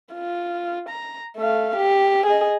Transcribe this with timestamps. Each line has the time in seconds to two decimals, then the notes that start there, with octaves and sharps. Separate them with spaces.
0.15 F4
0.89 A#5
1.37 A3 F5
1.76 G4
2.26 G#4 D#5